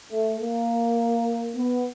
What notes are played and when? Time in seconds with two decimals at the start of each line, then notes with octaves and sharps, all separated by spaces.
0.11 A3
0.40 A#3
1.56 B3